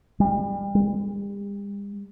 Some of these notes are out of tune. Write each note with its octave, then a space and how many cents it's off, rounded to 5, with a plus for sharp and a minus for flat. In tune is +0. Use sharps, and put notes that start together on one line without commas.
G3 +35
G3 +45